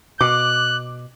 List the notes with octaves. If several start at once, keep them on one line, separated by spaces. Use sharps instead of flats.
B2 D6 F#6